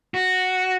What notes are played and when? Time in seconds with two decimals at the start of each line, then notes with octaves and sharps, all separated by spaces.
0.14 F#4